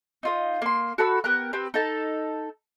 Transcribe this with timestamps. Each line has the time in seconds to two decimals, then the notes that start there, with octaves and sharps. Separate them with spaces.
0.23 D#4 F4 D#5
0.62 A#3 C6
0.98 F#4 A4 B5 E6
1.24 B3 G4 A#4 F#6
1.53 C4 G4 B4
1.74 D#4 A4 A5